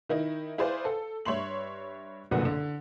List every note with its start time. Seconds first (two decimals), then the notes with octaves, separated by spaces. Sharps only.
0.09 D#3 D#4 E4
0.58 E4 G#4 B4 C5 D5 F5
0.85 A4
1.25 G2 C#5 E5 C6 F#7
2.31 F#1 C2 A#2 D3 B4 F#5
2.45 D3